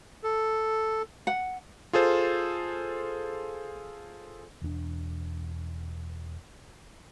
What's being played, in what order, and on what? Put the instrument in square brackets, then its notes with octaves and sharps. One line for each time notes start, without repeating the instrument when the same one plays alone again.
[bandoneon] A4
[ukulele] F#5
[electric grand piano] F4 G#4 A4 C5
[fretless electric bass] E1 E2 C#4 D4